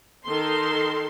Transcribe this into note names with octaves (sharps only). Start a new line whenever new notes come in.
D#3 A4 C6